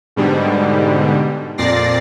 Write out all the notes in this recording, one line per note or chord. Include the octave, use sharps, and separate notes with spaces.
G#2 B2 D3 G3
F2 A#2 D5 A6 A#6 C7